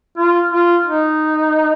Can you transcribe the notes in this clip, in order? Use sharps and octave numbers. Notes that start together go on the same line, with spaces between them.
F4
F4
D#4